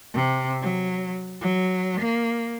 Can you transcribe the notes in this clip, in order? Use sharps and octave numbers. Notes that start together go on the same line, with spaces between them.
C3
F#3
F#3
A#3